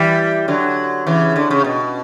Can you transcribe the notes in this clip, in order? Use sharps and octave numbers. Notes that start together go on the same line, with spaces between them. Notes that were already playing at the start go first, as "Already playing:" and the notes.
Already playing: E3 G3
D3 F#3
C#3 E3
D3
C#3
B2